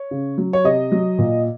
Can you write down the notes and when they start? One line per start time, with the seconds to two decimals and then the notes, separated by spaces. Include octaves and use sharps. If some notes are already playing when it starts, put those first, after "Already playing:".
Already playing: C#5
0.11 C#3
0.38 F#3
0.53 C#5
0.64 C3 D#5
0.92 F#3
1.19 A#2